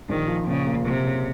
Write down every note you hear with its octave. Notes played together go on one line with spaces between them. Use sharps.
A#1 D#3
F3
A#2 C#3
A#3
F#1 C3
C#3